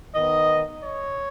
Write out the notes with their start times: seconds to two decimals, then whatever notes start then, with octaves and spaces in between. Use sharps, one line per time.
0.15 D#3 B3 D#4 D#5
0.83 C#5